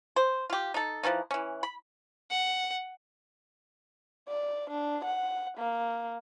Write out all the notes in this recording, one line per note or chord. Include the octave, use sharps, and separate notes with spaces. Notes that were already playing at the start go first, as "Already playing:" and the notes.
C5
F4 G4
D#4 A4
E3 F3 C#4 D#4
E3 C#4
B5
F#5
D5
D4
F#5
A#3